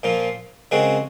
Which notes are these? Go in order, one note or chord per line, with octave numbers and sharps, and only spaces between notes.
A#2 F3 A#3 F4
C#3 G#3 C4 F#4 A#4